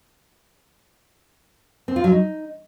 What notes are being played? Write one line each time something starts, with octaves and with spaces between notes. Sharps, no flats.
C4
F4
F#3
D#4